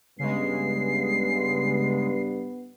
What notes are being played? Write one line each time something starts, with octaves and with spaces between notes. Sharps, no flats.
G2 C#3 G#3 B3 C7